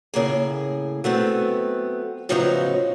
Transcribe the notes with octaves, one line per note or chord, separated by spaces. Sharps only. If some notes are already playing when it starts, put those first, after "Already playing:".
A2 C#3 A#3 G#4
F#3 A3 B3 C4
A2 C#3 F3 F#3 B3 D#4